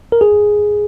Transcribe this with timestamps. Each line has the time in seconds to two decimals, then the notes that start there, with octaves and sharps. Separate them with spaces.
0.12 A#4
0.21 G#4